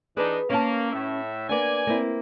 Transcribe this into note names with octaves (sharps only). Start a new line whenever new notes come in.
E3 D4 D#4 G#4 B4
A#3 C#4 A5
A2 E5
A#3 B3 D4 D5 G#5
A#3 C4 E4